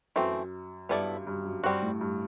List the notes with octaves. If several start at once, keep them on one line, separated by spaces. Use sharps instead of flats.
F#2 E3 A3 C4
G2 B3 E4 A4 D5
G2
F#2
G2 G3 C4 F#4
A2
G2